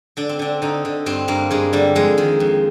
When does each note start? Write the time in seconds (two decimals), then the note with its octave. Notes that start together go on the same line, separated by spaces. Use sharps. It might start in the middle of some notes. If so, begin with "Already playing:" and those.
0.17 D3 D4
0.29 C4
0.39 D3 D4
0.62 D3 D#4
0.85 D3
1.06 G2 C4
1.28 G2 A#3
1.51 G2 G#3
1.73 D3 G3
1.95 F2 G#3
2.18 D#3
2.40 F2